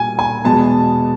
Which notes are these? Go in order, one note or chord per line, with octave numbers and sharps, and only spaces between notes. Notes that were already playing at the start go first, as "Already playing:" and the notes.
Already playing: A#2 G3 G#5
G#5
E2 B2 G#3 B3 A5